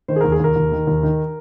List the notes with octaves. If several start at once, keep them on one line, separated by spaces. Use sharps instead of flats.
D#3 C5
G#4
D#2 A#4
G#4
D#2 A#4
D#2
D#3
D#2
D#3